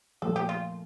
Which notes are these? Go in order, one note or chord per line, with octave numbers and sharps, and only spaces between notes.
A#2 F3 A3 A4
G4
F4